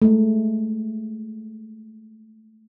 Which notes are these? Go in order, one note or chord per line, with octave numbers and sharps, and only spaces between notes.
G#3 A3